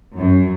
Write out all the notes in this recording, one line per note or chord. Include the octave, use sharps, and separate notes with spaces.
F#2